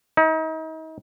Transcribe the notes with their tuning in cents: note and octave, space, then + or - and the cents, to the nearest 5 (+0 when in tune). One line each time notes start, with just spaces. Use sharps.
D#4 +35